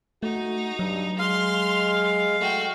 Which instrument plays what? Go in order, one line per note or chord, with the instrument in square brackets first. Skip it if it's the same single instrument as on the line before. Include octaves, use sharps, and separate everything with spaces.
[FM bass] A3 [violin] D#4 [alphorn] F#4
[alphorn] G2 [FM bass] F#3
[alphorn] G#3 [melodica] F5 [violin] C6 F6
[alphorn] A3 [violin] F#4 G5